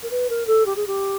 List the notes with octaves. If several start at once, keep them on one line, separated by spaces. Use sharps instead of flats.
A#4
B4
A#4
A4
G4
G#4
G4